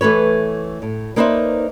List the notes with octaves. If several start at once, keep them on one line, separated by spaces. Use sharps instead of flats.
E3 A3 B4 C#5
A2
A#3 D#4 B4 C5 D5 E5